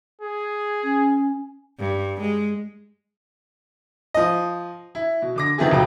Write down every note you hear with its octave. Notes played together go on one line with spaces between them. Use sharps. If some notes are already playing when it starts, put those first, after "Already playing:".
G#4
C#4
G2
G#3
F3 D#5
E4
B2
D3 D6 A#6
D#3 F3 B3 C4 E4 G#4
D#1 G#1 C#2 F#2 F4 G5